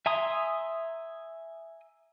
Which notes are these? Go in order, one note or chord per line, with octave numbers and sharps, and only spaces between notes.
E5 G#5 A#5 C6 D#6